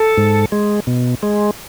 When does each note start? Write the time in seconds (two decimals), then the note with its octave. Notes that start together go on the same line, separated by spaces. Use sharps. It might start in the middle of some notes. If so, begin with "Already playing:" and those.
Already playing: A4
0.17 G#2
0.52 G#3
0.87 B2
1.23 G#3